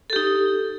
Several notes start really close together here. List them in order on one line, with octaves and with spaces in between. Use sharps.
A4 G4 D#4